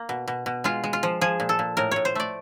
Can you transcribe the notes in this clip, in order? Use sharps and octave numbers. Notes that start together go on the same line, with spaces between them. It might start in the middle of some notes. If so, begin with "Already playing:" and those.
Already playing: A#3
B2
B2
B2
G#3 F4
G#3
F4
F3
F3 G#4
A#2
A4
A#2
A2 A#4
A2 C#5
C5
A3 D5